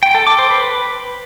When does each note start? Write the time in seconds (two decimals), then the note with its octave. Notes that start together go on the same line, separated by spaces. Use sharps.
0.03 G5
0.15 A4
0.27 D6
0.39 C5
0.50 B4